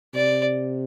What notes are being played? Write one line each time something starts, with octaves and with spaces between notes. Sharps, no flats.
C3 D5